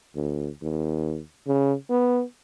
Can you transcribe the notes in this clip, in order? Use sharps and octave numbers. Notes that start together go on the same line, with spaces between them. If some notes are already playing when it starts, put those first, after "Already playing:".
D2
D#2
C#3
B3